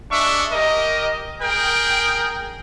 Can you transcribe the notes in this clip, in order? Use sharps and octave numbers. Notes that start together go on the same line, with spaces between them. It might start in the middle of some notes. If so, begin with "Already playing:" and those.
G#3 D4 E5 C#6
G4 A#4 D#5
G#4 A#4 G5